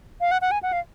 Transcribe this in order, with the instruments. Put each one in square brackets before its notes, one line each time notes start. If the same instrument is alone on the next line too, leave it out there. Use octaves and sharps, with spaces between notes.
[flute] F5
F#5
F#5
G#5
F#5
F5